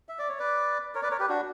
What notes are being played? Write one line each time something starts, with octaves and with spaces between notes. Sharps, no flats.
E5
D5
C#5
B4 D5
A#4 C#5
B4 D5
A#4 C#5
G4 B4
D4 F#4